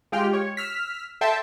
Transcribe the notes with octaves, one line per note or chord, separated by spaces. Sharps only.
G#3 F4 G4 G5 F6
C#5
E6 F6 B6
A4 E5 G5 A5 C6